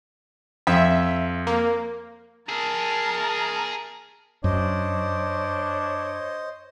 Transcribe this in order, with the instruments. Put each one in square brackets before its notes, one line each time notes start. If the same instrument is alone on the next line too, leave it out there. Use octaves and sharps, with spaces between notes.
[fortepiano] F2 [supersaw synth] E5
[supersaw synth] A#3
[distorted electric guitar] G#4 E5 [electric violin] A#4 A5
[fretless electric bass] F#2 [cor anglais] D4 [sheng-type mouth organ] C5 D#5 [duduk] C#5